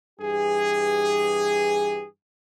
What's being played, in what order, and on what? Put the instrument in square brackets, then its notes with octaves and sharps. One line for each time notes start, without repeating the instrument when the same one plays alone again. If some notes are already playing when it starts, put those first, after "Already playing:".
[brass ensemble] G2 E3 G4 G#4